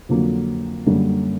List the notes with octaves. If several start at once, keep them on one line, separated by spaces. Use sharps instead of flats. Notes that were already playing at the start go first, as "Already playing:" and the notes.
F2 D3 F#3 A#3
F#2 D3 G3 A#3